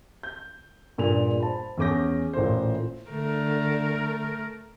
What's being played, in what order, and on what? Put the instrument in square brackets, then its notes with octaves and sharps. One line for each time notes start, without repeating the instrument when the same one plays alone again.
[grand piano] G6
G2 A#2 G#4 F7
C5 A5 B5
E2 C#4 G#4 D6 G6 A#6
A1 A#2 E4 A4 C5
[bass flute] D3 [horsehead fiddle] A3 A#4